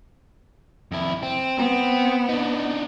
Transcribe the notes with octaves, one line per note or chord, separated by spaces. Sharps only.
F2 E4
C4
B3 C4
D4 D#4